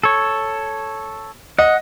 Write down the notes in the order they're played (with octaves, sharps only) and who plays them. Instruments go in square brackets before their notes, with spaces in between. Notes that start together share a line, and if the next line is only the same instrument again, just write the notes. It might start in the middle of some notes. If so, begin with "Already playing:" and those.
[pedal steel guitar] A4 C#5
[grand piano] D#5 [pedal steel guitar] F#5